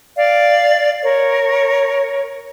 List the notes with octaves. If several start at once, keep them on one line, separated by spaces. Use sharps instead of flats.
D5 F5
A#4 C#5